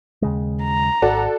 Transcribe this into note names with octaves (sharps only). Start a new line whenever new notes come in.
D#2 C#3 G#3
A#5
G#1 F#4 A4 D5